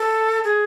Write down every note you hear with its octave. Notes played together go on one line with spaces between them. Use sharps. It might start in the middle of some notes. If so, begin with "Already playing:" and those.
Already playing: A4
G#4